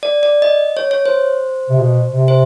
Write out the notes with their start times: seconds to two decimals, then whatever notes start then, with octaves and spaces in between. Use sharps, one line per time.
0.03 D5
0.23 D5
0.42 D#5
0.77 C#5
0.91 C#5
1.06 C5
1.69 C3
1.79 B2
2.09 C3
2.28 C5